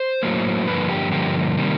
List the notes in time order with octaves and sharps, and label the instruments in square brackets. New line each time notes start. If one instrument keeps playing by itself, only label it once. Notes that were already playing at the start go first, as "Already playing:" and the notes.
Already playing: [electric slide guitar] C5
A2 F#3 A#3
G2 D3 F3 A#3 B4
G4
G2 D3 F3 A#3 G4
C3 D#3 G3 A#3